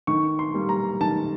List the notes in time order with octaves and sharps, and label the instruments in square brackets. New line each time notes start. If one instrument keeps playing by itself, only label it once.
[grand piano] D#3 C#6
C6
G3 A#3
A#5
D#3 A5